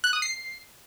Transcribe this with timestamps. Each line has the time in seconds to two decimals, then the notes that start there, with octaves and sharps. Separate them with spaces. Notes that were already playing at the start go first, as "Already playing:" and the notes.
0.04 F#6
0.13 D#6
0.22 C7